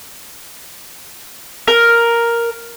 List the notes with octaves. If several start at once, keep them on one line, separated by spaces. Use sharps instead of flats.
A#4